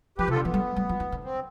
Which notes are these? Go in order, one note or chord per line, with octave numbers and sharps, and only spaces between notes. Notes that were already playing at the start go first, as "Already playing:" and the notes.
F3 G4 B4
C3 F4 A4
D3
E3 B3
G3
G3
F3
E3
D3
C4